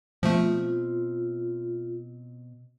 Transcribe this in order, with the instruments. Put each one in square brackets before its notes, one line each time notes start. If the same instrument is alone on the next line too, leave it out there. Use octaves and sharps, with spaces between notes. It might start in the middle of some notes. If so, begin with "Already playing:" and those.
[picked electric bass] B2 C4 [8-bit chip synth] F3 A3 [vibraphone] F4